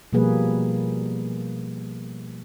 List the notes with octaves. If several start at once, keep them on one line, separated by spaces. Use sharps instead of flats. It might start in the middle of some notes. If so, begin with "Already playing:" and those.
B2 F3 G3 A#3 G#4 B4